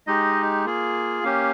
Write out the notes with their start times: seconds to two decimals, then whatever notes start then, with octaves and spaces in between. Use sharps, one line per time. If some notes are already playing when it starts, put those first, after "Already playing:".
0.07 G#3 D#4 G4 D#5
0.65 A#3 F4 G#4
1.24 A#3 C#4 G4 F5